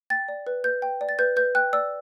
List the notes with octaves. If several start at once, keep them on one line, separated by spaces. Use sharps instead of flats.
G5 A6
D5
B4
B4 G6
G5
D5
A6
B4 G6
B4 G6
G5 F#6
D5 E6